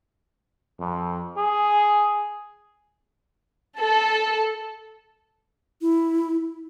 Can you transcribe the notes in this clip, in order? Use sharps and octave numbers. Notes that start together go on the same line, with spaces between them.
F2
G#4
A4
E4